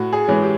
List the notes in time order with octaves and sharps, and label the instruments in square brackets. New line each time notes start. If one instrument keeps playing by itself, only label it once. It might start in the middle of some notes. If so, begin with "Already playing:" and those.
Already playing: [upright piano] A2 F#4
G#4
E3 G#3 C#4
G4